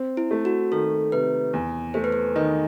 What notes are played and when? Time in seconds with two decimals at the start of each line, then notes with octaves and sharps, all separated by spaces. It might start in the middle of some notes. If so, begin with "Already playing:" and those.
Already playing: C4
0.17 E4
0.31 A3
0.45 F#4
0.72 D#3 A4
1.12 C3 B4
1.53 E2
1.94 A3 C5
2.04 B4
2.12 C5
2.35 D#3 D#5